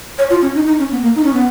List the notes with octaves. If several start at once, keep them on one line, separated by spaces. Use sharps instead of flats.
C#5
F4
C#4
D#4
D#4
C#4
B3
A#3
D#4
C#4
B3